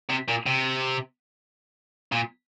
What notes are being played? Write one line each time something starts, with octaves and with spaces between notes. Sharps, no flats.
C3
A#2
C3
A#2